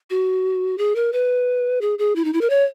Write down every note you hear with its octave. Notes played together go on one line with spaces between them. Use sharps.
F#4
G#4
A#4
B4
G#4
G#4
E4
D#4
E4
A#4
C#5